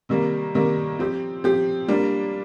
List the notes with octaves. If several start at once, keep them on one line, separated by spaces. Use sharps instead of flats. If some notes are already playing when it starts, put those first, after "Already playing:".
C3 D#3 G3 A#3
C3 D#3 G3 A#3
F3 C4 G4
F3 C4 G4
G3 A#3 D4 F4